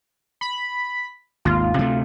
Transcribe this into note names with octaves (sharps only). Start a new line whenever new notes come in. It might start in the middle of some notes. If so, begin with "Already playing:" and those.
B5
G#1 D#2 F4
D2 C3 A3